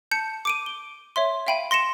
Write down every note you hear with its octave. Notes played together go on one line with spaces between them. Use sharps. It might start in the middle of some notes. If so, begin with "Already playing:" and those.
A5 G6 C#7
D6 D7 D#7
G7
C#5 E5 C6
E5 F5 G5 B5 D#7
C6 A#6 C#7 E7